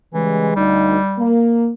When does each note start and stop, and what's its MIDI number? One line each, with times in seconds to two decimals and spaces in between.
0.14 0.51 49
0.14 0.52 52
0.14 0.51 55
0.14 0.51 56
0.56 0.96 38
0.56 1.36 55
0.56 0.96 63
1.18 1.71 58